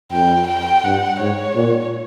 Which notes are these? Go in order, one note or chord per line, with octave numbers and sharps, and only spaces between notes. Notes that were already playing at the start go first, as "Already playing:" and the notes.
F2 G5
G5
G2 F#5
G#2 C#5
A#2